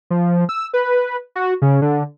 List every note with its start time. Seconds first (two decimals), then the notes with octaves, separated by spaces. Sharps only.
0.10 F3
0.49 E6
0.73 B4
1.36 F#4
1.62 C#3
1.82 D3